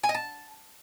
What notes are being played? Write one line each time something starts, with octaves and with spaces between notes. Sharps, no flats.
G#5
D#5
A5